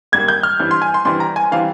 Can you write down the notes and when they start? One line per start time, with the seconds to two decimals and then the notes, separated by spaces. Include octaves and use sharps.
0.12 G#2 G3 A#3 G#6
0.28 G6
0.43 F6
0.60 G2 E3 G3 C4
0.71 C6
0.82 G#5
0.94 C6
1.05 G2 E3 G3 C4 C6
1.20 A#5
1.36 G#5
1.52 E3 G3 C4 F5